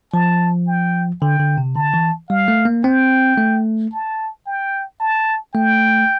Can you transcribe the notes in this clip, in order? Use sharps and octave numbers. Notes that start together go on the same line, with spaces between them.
F3 A5
G5
D3 G5
D3
C3
D3 A5
E3
G3 F5
A3
A#3
C4 G5
A3
A5
G5
A5
A3 G5